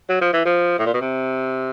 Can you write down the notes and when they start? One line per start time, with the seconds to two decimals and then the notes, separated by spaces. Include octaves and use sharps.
0.09 F#3
0.21 F3
0.33 E3
0.45 F3
0.79 A2
0.86 A#2
0.94 B2
1.01 C3